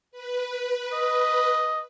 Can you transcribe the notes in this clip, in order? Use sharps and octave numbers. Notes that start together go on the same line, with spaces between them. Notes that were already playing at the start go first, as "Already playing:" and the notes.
B4
D#5